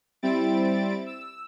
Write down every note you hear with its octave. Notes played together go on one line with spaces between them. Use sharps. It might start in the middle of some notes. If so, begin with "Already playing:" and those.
G3 C4 E4 A6 D7
E6